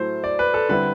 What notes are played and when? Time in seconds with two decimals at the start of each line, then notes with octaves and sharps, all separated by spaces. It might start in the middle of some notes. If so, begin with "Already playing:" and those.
Already playing: A2 F#3 A3 E4 C5
0.24 D5
0.39 B4
0.54 A4
0.69 D3 G3 C4 E4 B4